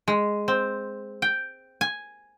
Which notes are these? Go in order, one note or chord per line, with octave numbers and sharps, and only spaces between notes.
G#3
C4
G5
G#5